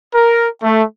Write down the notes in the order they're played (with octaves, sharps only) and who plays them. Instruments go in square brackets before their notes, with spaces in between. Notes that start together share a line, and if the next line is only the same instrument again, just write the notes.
[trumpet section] A#4
A3